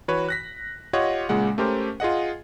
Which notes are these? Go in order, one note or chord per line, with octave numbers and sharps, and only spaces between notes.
E3 F#4 B4 C#5
F#6 A#6 B6
F4 G4 C#5 D#5 F#5
A#2 C#3 G#3 F#5
A3 C#4 G4 A#4 C5
F4 G#4 D#5 F#5